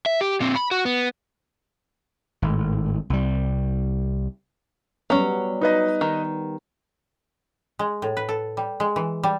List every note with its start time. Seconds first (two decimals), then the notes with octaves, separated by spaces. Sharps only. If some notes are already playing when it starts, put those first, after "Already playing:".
0.06 E5
0.21 G4
0.40 A#2 C4
0.56 B5
0.71 F#4
0.85 B3
2.42 G#1 A2
3.10 C2 G3
5.10 F#3 G3 B3 C#4
5.61 D#4 B4 D#5
6.01 D#3
7.79 G#3
8.02 A2
8.17 B4
8.29 A4
8.57 G3
8.80 G#3
8.96 E3
9.24 G3